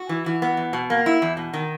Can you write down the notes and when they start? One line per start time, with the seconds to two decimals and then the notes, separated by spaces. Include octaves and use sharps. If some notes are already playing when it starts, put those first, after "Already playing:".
Already playing: F#4
0.09 E3
0.26 E3
0.42 B3
0.57 E2
0.73 B2
0.90 A#3
1.06 E4
1.22 E2
1.37 B2
1.54 D#3